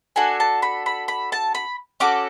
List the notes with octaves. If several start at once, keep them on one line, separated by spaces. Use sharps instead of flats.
D4 F#4 A4 G#5
A5
B5
B5
B5
A5
B5
C#4 F#4 A4 D6